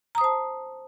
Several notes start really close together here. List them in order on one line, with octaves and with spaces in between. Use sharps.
A#5 D#6 C5 A5